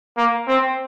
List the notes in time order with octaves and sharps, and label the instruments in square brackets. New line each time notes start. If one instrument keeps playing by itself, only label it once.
[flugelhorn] A#3
C4